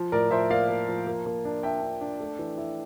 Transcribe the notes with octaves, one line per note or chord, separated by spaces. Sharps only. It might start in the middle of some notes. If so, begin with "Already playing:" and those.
Already playing: F3
A2 A#4 D5
F3 C5 E5
A#3 D5 F5
A#3
F3
A#3
A#3
D4
D4 E5 G5
D4
D4
A3
E3
E4